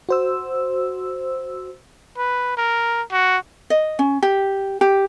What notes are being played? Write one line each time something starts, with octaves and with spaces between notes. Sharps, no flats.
F#4 C5 E6
B4
A#4
F#4
D#5
C#4
G4
G4